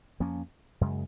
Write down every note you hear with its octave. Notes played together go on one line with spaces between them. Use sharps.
F2 F3 A#3 C#4
F#2 C#3 G#3